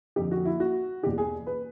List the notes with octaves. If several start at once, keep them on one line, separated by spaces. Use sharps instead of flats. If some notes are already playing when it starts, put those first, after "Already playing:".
F2 D3 G4
F#4
E4
F#4
E2 B2 G4
G#4
B4